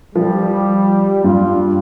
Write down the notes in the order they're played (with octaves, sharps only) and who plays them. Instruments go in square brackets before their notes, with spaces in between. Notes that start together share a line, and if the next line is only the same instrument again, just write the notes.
[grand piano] F3 [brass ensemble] G3
[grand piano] G2 [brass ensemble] F4